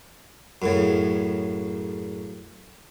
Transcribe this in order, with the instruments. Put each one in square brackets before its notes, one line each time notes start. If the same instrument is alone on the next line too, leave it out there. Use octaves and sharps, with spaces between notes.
[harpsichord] F#2 A2 C#3